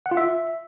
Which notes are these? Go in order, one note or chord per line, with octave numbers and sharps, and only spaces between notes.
F#5
F4
E5